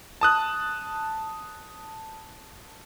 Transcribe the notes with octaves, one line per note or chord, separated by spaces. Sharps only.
A5 D#6 F#6